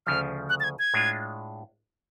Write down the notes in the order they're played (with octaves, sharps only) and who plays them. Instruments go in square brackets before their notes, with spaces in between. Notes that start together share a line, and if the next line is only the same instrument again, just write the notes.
[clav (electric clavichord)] D2 C#3 F3 [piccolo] F6
[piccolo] F#6
A6
G#6
G#6
[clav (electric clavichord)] A2 G#3 D4 F4